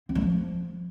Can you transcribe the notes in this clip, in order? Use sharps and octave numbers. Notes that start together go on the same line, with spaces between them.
C4
G#3
F3